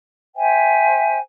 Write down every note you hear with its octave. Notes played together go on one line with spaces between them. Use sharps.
C5 E5 G5 G#5